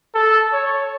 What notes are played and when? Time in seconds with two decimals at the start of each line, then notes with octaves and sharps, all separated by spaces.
0.15 A4
0.53 C#5